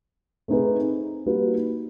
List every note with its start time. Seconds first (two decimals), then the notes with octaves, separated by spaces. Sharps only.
0.48 A3 C4 D#4 G#4 B4
1.26 G3 A#3 D#4 F#4 B4